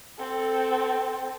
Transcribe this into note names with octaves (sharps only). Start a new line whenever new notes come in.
C4 A4